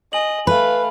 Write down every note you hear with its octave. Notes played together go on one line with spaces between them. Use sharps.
D#5 G#5 F#7
A3 B4 F5 B5